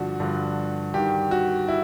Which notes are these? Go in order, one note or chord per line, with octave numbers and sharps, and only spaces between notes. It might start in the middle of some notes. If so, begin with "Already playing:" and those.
Already playing: G2 D3 F3 F#4
G2 D3 F3
G2 D#3 G4
F#4
E4